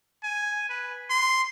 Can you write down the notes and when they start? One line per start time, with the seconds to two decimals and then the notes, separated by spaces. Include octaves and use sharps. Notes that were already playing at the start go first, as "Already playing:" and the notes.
0.23 G#5
0.69 B4
1.10 C6